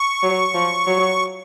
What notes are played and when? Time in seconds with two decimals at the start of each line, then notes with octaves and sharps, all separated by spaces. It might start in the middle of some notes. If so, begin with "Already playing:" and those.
Already playing: C#6
0.23 F#3
0.54 F3
0.87 F#3